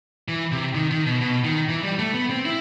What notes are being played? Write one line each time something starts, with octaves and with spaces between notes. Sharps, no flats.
E3
C3
D#3
D#3
B2
B2
D#3
E3
G3
A3
B3
C4
E4